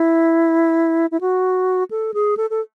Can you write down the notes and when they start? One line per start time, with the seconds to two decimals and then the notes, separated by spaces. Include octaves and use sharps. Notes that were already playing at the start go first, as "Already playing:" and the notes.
Already playing: E4
1.11 E4
1.21 F#4
1.91 A4
2.14 G#4
2.37 A4
2.50 A4